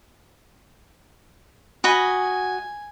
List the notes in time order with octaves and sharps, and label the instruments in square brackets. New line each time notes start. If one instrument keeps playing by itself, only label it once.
[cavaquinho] F#4 D#5 B5 [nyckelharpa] G#5